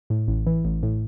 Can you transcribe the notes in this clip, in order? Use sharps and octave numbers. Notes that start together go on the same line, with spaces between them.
A2
A1
E3
A1
A2